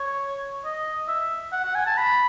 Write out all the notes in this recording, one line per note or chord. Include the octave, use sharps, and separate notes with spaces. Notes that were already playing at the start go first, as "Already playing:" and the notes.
Already playing: C#5
D#5
E5
F#5
F#5
G#5
A5
B5